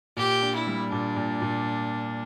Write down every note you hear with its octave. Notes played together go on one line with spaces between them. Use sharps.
A#2 G4
D4
E4
G3
A#2 D4
A#2
A#2